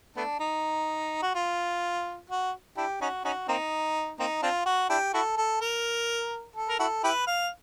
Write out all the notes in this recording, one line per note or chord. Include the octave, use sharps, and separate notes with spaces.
A3 B3 D4
D#4
F#4
F4
F#4
D4 E4 G4
C#4 D#4 F#4
C#4 D#4 F#4
A#3 C4 D#4
A#3 C4 D#4
C4 D4 F4
F#4
D4 E4 G4
E4 F#4 A4
A4
A#4
A4
A#4
E4 F#4 A4
E4 G4 B4
F5